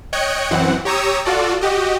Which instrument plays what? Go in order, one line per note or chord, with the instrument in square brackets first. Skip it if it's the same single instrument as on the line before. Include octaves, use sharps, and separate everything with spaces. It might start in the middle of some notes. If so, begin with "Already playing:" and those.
[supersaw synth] C#5 D#5 G5 F#6 G#6 C#7
F#2 E3 C4 F#5
G4 C#5 A#5 C#6 D#6 E6
F4 F#4 A4 D5
F#4 G4 D#5